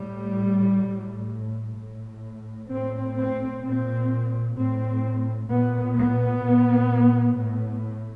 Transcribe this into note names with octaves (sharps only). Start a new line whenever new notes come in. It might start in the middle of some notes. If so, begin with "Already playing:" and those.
Already playing: A2 G3
A2
A2
A2 C4
C4
A#2 C4
A2 C4
A#2 B3
B3
A#2
A2